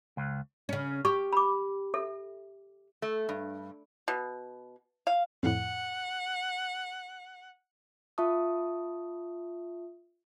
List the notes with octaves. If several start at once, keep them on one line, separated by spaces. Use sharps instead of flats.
C#2
C#3 C#4
G4 C#6
B5 D6
A4 E5
A3
G2
B2
F5
F2 A2 F#5
F4 E5 A5 C#6 D#6